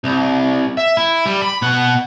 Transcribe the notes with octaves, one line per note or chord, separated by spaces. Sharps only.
C2
E5
E4
G3
B5
B2 F#5